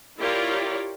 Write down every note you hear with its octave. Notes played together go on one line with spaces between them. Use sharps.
E4 F4 G4 A#4 C#5 D5